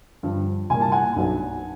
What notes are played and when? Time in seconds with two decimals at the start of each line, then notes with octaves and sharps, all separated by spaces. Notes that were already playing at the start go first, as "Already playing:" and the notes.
0.23 G2 D3 F3
0.70 C2 A#2 G3 A#3 G#5
0.81 A5
0.92 F#5 G#5
1.16 B1 B2 F#3 B3 D4